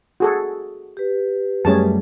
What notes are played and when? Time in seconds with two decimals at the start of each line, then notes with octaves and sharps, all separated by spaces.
0.20 F#4 G#4 A4
0.97 G4 B4
1.65 F#2 G3 A3 C#4 G#4 A5